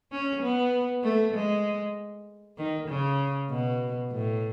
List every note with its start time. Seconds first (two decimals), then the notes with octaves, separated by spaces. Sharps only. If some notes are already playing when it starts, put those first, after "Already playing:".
0.11 C#4
0.42 B3
1.04 A3
1.34 G#3
2.57 D#3
2.89 C#3
3.50 B2
4.12 A2